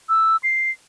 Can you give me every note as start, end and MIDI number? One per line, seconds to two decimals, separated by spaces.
0.09 0.37 88
0.43 0.71 96